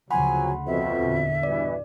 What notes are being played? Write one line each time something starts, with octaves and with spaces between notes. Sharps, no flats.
D2 C#3 F3 F#3 F#5 G#5 B5 C6
F2 B2 E5
E2 A#2 D3
G2 B2 E3 D5